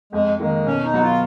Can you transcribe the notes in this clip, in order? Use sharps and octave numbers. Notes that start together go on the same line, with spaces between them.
F2 G#3
D#3 G#3 A#3
B2 C#4
D#4
F#3 B3 F#4
F4